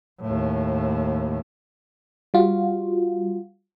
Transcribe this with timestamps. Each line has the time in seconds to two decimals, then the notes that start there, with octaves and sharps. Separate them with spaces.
0.22 D#2 A2
2.34 G3 F4 F#4